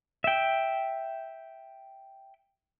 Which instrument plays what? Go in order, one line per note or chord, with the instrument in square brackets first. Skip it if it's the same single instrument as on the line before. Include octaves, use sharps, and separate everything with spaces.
[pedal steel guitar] E5 G5